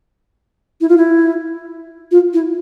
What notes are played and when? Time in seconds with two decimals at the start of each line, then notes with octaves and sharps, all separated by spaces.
0.80 E4
0.88 F4
0.97 E4
2.11 F4
2.33 E4